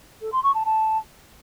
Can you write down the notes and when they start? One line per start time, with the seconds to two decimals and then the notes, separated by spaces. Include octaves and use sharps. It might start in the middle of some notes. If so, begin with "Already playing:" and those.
0.21 A4
0.32 C6
0.43 C#6
0.54 A5
0.65 A5